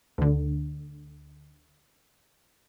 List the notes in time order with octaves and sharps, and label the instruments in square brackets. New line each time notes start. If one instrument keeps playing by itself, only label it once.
[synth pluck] D2 D3